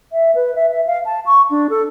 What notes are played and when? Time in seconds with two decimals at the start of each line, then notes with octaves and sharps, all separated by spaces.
0.12 E5
0.35 B4
0.55 E5
0.71 E5
0.87 F5
1.05 A5
1.26 C#6
1.51 D4
1.70 A4